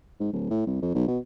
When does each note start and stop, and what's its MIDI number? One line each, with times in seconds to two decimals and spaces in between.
0.20 0.30 44
0.33 0.50 26
0.50 0.67 45
0.67 0.79 36
0.82 0.90 41
0.95 1.07 35
1.08 1.19 47